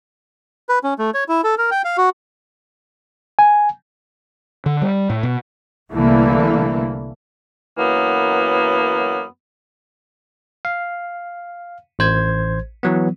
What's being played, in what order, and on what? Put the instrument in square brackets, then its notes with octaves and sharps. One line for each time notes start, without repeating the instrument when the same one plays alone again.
[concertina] B4
C#4
A3
C#5
E4
A4
A#4
G5
F5
F#4
[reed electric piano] G#5
[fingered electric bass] D3
G3
A2
B2
[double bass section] C2 D3 E3 A3 A#3
[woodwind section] F#2 E3 F#3 A#3 B3
[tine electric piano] F5
A1 C5 G#6
E3 F#3 B3